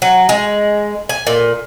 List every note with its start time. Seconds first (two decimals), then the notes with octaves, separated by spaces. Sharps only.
0.02 F#3
0.29 G#3
1.09 G#5
1.27 A#2